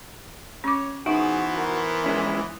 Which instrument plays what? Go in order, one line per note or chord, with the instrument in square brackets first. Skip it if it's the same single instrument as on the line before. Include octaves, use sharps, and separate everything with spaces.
[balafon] C#4 D6 [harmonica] C#5
[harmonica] E3 B3 C5 [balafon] D#4 E5 [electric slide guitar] F#4 [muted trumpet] G#4
[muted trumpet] A#4
[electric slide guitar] G#3 C#4 E4